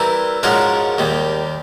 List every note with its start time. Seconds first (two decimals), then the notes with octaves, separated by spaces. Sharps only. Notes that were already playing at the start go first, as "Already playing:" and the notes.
Already playing: E3 G3 C4 E4 A#4
0.43 G#2 F3 G#3 C#4 F#4 A#4
0.98 D#2 D#3 G3